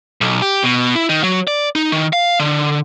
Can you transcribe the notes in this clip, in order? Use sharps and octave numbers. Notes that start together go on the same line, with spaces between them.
B1
G4
B2
E4
D#3
F#3
D5
D#4
D#3
F5
D3